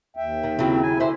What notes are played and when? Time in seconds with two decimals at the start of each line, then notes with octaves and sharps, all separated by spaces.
0.17 D#2 E5 G5
0.44 D#3
0.59 C#3 F#3 C4 E4
0.83 G#5
1.00 D3 C5 E5